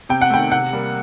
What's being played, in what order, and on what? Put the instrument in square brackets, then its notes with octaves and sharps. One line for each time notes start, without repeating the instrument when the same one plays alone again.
[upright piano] C3 G5
F#5
D#3 A3 G5
C3 F#5
G3 A#3